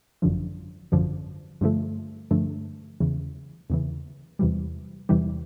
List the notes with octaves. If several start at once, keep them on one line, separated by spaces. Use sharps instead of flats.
G#1 F#2 D3 F3
G#1 F#2 D3 F3
G2 D3 F3 A3
G2 D3 F3 A3
E2 C#3 E3
E2 C#3 E3
E2 C3 E3 G3
E2 C3 E3 G3